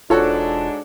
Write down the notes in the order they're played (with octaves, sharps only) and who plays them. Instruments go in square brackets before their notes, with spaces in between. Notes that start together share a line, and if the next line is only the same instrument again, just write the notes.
[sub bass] E1 [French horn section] G#2 D4 [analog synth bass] F4 [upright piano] F#4 A4 C#5